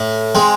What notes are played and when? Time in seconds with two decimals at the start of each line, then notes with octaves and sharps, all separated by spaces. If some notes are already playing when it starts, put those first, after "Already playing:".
Already playing: A2
0.35 G#3 C4